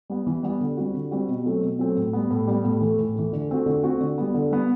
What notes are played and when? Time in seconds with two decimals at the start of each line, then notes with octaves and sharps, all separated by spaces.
0.09 G3 B3
0.27 E3
0.43 G3 B3
0.60 D3
0.77 G3 C4 F#4
0.94 D3
1.11 G3 C4 F#4
1.28 B2
1.45 F#3 A3 C4
1.62 B2
1.79 F#3 A3 C4
1.97 A2
2.13 G3 B3
2.31 A2
2.47 G3 B3
2.64 A2
2.81 E3 A3
2.99 A2
3.16 E3 A3
3.33 D3
3.49 A3 C4 F#4
3.66 D3
3.83 A3 C4 F#4
4.00 D3
4.18 G3 B3
4.34 D3
4.51 G3 B3